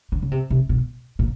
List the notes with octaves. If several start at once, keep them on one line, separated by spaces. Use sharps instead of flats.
D3
C#3
C3
C3
B2
A#2